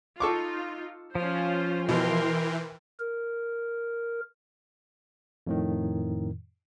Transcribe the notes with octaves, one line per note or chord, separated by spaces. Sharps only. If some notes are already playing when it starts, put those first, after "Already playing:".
D#4 F4 A4 C#6 D6
F3 C#4 F4 C5
B2 E3 A#4 G5 C6
A#4
F2 A2 D#3